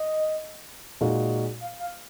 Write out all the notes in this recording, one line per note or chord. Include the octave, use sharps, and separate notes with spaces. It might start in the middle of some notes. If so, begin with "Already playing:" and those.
Already playing: D#5
A#2 G#3 D#4 F#4
F5
F5